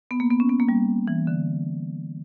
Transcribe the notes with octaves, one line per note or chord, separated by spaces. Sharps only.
B3
A#3
B3
C#4
B3
A#3
G3
E3
D3